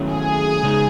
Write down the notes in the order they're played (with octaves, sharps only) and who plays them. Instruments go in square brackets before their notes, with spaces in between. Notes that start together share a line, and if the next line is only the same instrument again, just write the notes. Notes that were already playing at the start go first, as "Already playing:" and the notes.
Already playing: [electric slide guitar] D#3 F#3 A3 C#4 E4
[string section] G#4
[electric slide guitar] C#3 G#3 D#4